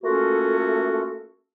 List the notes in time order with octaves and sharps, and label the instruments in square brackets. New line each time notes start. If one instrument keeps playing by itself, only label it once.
[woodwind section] A3 A#3 C#4 F4 F#4 A4